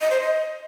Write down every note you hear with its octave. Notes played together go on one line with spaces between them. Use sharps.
D#5
C5
D#5